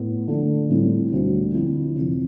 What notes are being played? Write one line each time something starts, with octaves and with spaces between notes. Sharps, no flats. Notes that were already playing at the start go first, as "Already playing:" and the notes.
Already playing: A2 B3
D3 F3 A3
A2 G3 C4
D2 D3 G3
D3 F3 C4 E4
F2 C3 E3